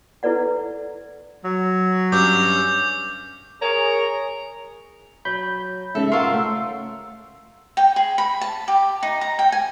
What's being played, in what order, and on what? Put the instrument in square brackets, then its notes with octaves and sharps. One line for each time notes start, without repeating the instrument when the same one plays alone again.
[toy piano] E4 A4 B4 D5 F#5
[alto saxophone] F#3
[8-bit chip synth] G2 C#4 [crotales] D6 G6
[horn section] G#4 A#4 C#5
[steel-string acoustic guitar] F#3 [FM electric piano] B5 G6
[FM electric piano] G#2 C#3 A3 [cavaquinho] A4 [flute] E5
[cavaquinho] F4 A#4 [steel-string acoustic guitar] F5 F#5 [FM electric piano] C6 C#6 [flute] E6
[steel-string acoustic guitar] C#3 A3
[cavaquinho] G5
G#4
B5
A5
G4
D#4
A#5
G5
G#5